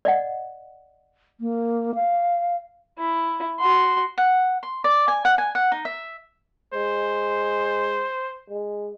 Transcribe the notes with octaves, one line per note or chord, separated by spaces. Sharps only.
D5 D#5 F#5
A#3
F5
E4
F#4 C6
F#5
C6
D5
G#5
F#5
G#5
F#5
D#4
E5
G#3 C5
G#3